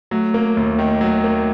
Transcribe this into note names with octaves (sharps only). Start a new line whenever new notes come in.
F#3 A3
A#3
D#2
D#3
F#3
A#3